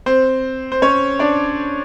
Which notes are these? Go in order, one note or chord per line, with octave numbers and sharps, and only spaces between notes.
C4 C5
C5
C#4 C#5
D4 D5